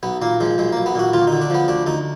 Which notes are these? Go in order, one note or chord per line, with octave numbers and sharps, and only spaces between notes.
B1 B3
A#2 A#3
F3 G#3
B1 G#3
B1 A#3
B3
A#2 F#4
D2 F4
D#4
D3
D4
F3 B3
D2 D4
D2 D#4